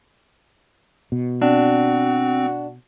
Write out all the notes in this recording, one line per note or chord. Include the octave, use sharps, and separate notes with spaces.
B2
C4 D4 F#4